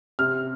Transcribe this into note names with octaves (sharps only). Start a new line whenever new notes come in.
C3 F6